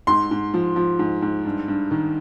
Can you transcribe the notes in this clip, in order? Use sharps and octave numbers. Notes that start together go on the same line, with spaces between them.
G#2 C6
G#2
F3
F3
G#2
G#2
G2
G2
D#3